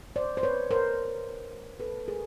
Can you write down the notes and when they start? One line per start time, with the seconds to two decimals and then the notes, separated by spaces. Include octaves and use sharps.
0.16 C5 D5
0.37 C5
0.43 B4 C#5
0.71 A#4 C5
1.80 A4 B4
2.08 G#4 A#4